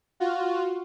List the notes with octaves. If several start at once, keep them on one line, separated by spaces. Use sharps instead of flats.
F4 F#4